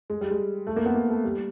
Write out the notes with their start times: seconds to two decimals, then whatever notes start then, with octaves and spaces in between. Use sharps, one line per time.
0.10 G#3
0.21 G3
0.31 G#3
0.67 A3
0.76 A#3
0.86 B3
0.95 A#3
1.10 A3
1.24 G3